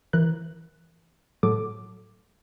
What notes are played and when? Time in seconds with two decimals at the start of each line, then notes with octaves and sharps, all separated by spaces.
0.13 E3 A#4 F#6
1.43 A2 F#3 A4 D6